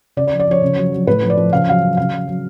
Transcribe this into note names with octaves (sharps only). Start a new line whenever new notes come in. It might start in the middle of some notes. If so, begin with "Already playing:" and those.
C#3 D5
D5
F3
D5
F3 C#5
C#3
F#3
F#3
A2 B4
F3
D5
F3
C#3 F5
F#3 F5
F#3
C#3 F5
F#3
F#3